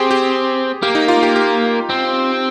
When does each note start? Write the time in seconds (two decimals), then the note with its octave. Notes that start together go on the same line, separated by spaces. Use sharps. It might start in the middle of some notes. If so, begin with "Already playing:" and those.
Already playing: C4 G4 G#4
0.11 G4
0.82 A#3 G4
0.95 D#4
1.08 F4
1.23 G4
1.36 G4
1.89 C4